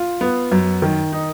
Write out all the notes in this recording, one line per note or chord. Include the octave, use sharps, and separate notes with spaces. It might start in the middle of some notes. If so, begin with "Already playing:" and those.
Already playing: F4
B3
F#2
D#3
D#4